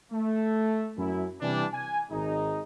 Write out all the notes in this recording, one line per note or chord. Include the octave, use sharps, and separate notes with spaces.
A3
F#2 E4
C3 E3 G3 D4
G#5
G#1 G#3 D#4